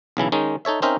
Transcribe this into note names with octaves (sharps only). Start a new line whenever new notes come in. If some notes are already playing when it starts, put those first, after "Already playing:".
B1 C#3 E3 E4
D#3 G#3 C#4 D#4
D#4 A4 C#5 E5
C4 C#4 D#4 A#4 C5 E5